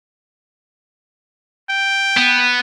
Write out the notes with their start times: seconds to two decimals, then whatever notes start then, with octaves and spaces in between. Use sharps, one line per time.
1.70 G5
2.17 B3